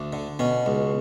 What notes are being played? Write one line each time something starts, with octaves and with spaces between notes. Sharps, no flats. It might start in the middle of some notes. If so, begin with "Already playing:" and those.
Already playing: D2 D4
D3
B2 C#4
C#2